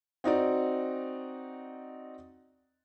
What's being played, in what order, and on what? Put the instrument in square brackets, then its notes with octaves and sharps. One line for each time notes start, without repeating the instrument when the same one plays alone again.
[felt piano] C4 D#4 F#4 D5